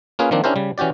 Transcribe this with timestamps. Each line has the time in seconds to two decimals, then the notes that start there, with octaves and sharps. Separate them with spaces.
0.19 A#3 C#4 F4 G#4 B4
0.31 D#3 F3 A#3 C4 D4
0.44 C#4 D4 E4 G4 A#4 C5
0.56 C#3 G3
0.78 E3 C#4 F#4 G4 D5